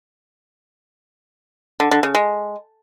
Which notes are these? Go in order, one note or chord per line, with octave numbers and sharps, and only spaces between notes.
D3
D3
C#3
G#3